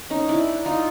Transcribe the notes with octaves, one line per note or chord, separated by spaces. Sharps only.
C#4 D#4
D4 E4
D#4 F4